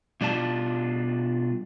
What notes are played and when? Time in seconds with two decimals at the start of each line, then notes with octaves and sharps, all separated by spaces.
0.21 B2 G3 D4 F4 A5